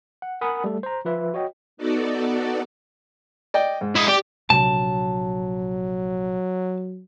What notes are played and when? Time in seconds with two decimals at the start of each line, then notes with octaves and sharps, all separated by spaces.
0.22 F#5
0.41 A#4 F#5 G#5 B5 D#6
0.64 G3 A3 A4
0.83 C5 A#5
1.05 F3 F4 B4 E5
1.34 F#4 C#5 D#5 G5
1.77 B3 D#4 F#4 A4 D5
3.54 D5 D#5 G5
3.81 G#2
3.96 E4 D#5
4.08 G4 D5 G5 D6
4.50 A#1 C3 F#3 A5